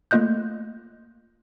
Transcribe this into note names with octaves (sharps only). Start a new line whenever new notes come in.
A3 A#3 F4 D#5 F#6 G6